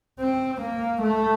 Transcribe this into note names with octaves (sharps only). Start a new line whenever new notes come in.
C4
A#3
A3